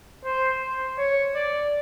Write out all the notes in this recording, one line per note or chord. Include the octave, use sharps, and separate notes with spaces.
C5
C5
C#5
D5